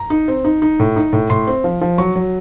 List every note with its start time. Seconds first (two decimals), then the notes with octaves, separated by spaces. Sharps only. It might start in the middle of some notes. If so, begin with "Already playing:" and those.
Already playing: A#5
0.10 D#4
0.28 C4
0.45 D#4
0.62 D#4
0.80 A2
0.96 D#4
1.13 A2
1.30 A2 C6
1.47 C4
1.64 F3
1.81 F3
1.98 F#3 C#6
2.16 F#3